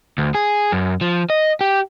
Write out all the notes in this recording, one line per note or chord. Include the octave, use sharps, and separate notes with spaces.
D2
G#4
F#2
F3
D#5
G4